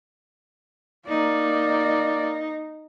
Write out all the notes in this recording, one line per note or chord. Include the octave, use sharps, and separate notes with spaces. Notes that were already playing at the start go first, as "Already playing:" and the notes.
A#3 D#4 D5